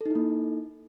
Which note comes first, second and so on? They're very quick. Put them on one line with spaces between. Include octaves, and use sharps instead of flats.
A4 D#4 E4 A#3